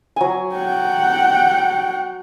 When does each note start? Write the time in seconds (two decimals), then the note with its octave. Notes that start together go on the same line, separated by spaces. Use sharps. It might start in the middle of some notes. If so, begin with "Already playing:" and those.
0.16 F#3 G#5
0.55 F#5 G5